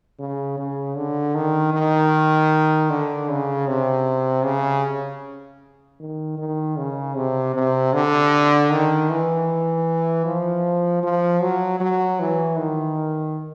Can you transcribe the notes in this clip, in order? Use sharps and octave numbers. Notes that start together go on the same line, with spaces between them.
C#3
C#3
D3
D#3
D#3
D3
C#3
C3
C#3
D#3
D#3
C#3
C3
C3
D3
D#3
E3
F3
F3
F#3
F#3
E3
D#3